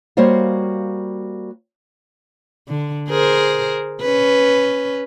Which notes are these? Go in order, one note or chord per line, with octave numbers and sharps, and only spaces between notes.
G3 A#3 F#4 C5 C#5 F5
D3
G#4 A#4 C5
C#4 B4